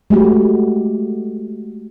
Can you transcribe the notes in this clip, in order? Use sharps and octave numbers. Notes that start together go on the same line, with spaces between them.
G#3 A3 F#4 G4